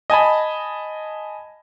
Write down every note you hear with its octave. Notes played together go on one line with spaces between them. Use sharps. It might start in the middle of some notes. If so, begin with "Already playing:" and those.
D#5 G#5 A5 B5